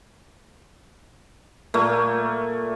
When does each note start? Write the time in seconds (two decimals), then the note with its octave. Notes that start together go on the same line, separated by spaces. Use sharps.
1.74 A#2 A3 A#3